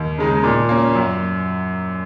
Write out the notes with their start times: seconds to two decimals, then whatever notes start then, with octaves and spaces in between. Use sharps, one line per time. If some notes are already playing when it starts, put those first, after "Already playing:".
Already playing: D#2
0.18 C#3 G#3 D#4
0.43 A#2
0.69 A#3 C#4
0.95 F#2